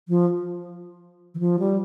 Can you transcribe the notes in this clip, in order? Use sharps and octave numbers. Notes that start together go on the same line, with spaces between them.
F3
E3
F3
G3